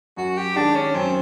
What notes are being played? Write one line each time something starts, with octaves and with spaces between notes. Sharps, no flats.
F#2 F#4
G4
D#3 G#3 D4
C#4
F#2 C4